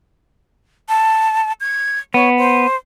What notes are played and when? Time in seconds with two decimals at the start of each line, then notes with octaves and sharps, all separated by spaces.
0.89 A5
1.61 G#6
2.14 B3 C#5
2.38 C5